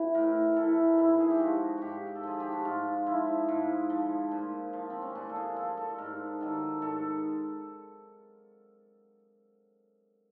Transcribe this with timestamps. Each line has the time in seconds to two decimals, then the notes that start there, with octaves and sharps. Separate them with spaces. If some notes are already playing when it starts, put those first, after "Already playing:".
Already playing: E3
0.15 A2 A#4
0.56 E3 A4
0.98 G#2 E4
1.20 G#4
1.30 G4
1.40 F3 F#4
1.78 G#2 F#4 G4
2.15 A4
2.23 F3 G#4
2.40 G4
2.53 F#4
2.65 G#2 F4
3.06 F3 E4
3.48 G#2
3.90 F3
4.31 A#2
4.73 F3
4.90 C4
5.02 C#4
5.15 A#2 D4
5.29 A4
5.36 G#4
5.56 F3 A4
5.77 A4
5.98 G#2 A#4
6.41 D#3 F#3 A4
6.82 G#2 A4